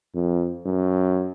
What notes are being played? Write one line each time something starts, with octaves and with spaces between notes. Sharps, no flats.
F2
F#2